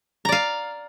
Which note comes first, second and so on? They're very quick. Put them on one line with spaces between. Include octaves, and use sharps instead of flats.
A#5 D5 F5